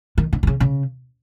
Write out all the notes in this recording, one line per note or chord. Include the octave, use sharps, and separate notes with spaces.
D#3
D3
D3
C#3
C#3